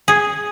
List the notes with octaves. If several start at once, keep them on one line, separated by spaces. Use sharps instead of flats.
G#4